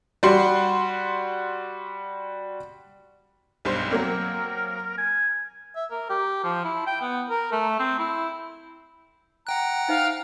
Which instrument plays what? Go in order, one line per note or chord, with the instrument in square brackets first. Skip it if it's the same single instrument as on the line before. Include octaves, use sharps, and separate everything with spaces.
[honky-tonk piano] G3 F#4 F#5 C6
B1 G2 C5
[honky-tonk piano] F#3 A#3 C4 [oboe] A#4
[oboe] G#5
[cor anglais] E5
A#4
G4
F3
E4
G5
B3
A#4
A3
C4
E4
[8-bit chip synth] F#5 G5 F#6 [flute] A#5
[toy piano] D#4 C5 E5 [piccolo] F5